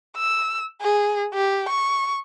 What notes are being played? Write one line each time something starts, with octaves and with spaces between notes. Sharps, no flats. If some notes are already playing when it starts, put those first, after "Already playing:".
E6
G#4
G4
C#6